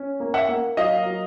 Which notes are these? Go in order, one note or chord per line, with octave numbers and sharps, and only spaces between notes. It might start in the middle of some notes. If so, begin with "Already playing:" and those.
Already playing: C#4
A#3
E5 F#5
A#3
F#3 D#5 F5
F#3